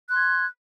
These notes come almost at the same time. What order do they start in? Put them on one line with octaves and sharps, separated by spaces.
F#6 C6 G#6